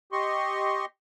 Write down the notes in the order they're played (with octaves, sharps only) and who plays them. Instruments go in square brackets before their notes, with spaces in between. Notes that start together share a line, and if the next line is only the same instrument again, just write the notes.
[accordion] G4 D#5 C6 C#6